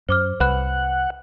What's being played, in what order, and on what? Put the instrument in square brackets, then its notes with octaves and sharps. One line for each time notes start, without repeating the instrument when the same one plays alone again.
[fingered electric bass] F#2 [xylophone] C5 D6 F6
[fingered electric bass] C2 [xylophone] B4 B5 F#6 [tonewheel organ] F#5